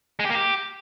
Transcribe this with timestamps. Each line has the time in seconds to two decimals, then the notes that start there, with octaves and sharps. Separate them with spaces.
0.19 G#3
0.25 G4
0.30 A#3
0.35 G4